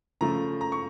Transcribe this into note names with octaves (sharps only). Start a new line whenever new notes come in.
C#3 F3 A3 A#5
A#5
C#6